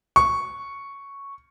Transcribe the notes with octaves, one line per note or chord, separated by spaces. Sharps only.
C#6